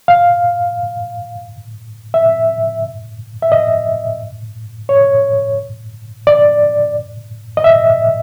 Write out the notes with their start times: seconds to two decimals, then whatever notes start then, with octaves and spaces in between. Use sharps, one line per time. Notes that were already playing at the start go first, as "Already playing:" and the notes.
0.08 F5
2.14 E5
3.42 E5
3.52 D#5
4.89 C#5
6.27 D5
7.57 D#5
7.64 E5